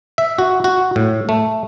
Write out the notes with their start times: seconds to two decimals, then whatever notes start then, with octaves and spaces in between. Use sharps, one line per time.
0.18 E5
0.38 F#4
0.64 F#4
0.96 A2
1.29 A3